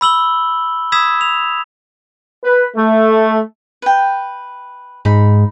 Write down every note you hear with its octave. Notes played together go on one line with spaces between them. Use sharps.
B5 E6 F#7 G7
B5 D#6 E6 G#6 B6 E7
F7
B4
A3
B4 G5
G#2 D#4 B5